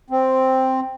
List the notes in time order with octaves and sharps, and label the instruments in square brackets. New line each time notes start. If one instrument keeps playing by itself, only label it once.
[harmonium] C4